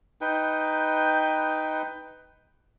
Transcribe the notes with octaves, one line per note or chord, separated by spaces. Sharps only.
D#4 B4 G5